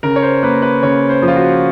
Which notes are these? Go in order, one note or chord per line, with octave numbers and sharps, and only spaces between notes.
C#3 A#4
C#5
C5
A#3 B4
B4
C#3 C#5
C5
F3
F4
F#4